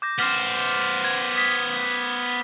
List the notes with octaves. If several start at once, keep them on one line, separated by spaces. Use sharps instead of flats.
D6 G6 A#6
B3 C5 D6 F6 A6
G#6
D#6 B6 G7